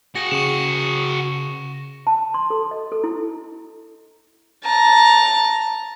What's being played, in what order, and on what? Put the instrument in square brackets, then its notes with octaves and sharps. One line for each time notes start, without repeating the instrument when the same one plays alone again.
[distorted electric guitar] F#4 G#4 [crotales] A#6
[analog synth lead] C#3 [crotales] C#6 E7
[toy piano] A5
C6
A4
D#5
A4
E4
[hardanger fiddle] A5 A#5